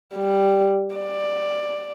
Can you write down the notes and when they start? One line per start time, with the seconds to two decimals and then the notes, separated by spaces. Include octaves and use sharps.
0.15 G3
0.95 D5